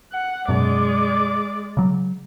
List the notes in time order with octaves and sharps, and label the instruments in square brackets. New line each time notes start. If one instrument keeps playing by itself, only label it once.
[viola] F#5
[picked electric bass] F#2 B2 [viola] G#3 D5
[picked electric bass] C#3 F#3